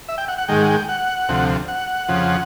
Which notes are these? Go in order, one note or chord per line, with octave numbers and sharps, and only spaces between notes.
E5
G5
F#5
F#5
G#2 D#3 G#3 G5
F#5
G5
F#5
D2 C3 F3
F#5
F2 C#3 F3